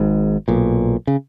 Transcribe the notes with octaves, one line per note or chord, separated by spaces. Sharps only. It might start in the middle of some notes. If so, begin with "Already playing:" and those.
Already playing: G#1 G#2
B1 A#2
C#3